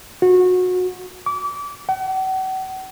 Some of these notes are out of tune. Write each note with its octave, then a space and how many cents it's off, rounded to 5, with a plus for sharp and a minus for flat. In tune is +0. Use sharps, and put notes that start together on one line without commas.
F#4 -25
D6 -30
F#5 +40